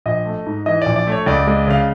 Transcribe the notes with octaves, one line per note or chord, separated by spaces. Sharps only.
A#1 D#5
A3
G#2
E3 D#5
A#1 D5
D5
A3
C#5
C#2 D5
G#3
C#3 F5